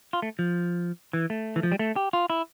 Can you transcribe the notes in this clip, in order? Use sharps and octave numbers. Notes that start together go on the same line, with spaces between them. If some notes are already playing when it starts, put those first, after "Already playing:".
F4
A3
F3
E3
A3
E3
F3
G3
A3
G4
F4
E4